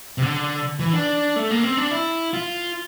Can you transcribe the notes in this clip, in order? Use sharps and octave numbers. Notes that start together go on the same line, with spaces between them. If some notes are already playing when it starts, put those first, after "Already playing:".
C3
D3
E3
D4
A3
A#3
C4
D4
E4
F4